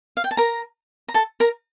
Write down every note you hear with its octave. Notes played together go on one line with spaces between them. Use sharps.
F5
G5
A5
A#4 A#5
A#5
A4 A5
A#4 A#5